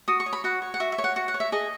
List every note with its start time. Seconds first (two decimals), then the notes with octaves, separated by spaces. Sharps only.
0.08 F#4 D#6
0.20 C#6
0.26 C#5
0.33 B5
0.44 F#4 F#5
0.62 C#5
0.74 F#5
0.80 F#4 E5
0.92 E5
0.98 C#5
1.04 F#5
1.16 F#4 F#5
1.28 F#5
1.34 C#5
1.40 E5
1.52 G#4 D#5